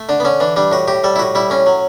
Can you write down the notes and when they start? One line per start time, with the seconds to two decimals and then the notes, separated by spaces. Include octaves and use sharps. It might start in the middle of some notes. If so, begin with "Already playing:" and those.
Already playing: A3
0.09 D3 D4
0.20 B3
0.25 D3 C#4
0.40 E3 D4
0.56 G3 D4
0.71 A2 F#4
0.88 A2 G4
1.04 G3 A4
1.16 E4
1.19 A2 F#4
1.35 G3 E4
1.50 A2 C#4
1.66 F#3